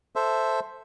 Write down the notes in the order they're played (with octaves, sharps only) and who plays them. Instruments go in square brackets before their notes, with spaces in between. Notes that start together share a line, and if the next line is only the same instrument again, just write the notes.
[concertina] A4 C5 E5